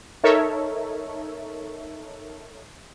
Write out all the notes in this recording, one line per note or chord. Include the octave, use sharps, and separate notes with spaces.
D#4 A4 A#4 C#5 E5